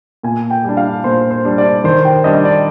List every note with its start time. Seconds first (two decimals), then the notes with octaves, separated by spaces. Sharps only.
0.23 A#2 G#5
0.50 G5
0.65 G3 D4
0.77 F5
1.04 A#2 C5
1.31 C5
1.45 G3 D4
1.58 D5
1.84 D#3 C5
2.05 G5
2.24 G3 D4 D#5
2.45 D5